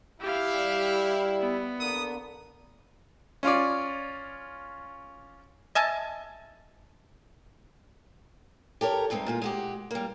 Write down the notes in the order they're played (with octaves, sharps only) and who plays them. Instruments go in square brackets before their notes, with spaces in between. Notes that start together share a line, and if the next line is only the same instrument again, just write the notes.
[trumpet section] E4 [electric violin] G4 F5
[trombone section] G3
[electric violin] B3
[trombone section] D3 A#3 [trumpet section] D#6
[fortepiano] C#4 F4 C#5 D5
[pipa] D#5 E5 G#5 A5
[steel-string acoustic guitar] G4 A4 A#4 C#5
G2 G#3 C4 D4 D#4
A#2 A#3 F4
G#3 F#4 G4
G3 A#3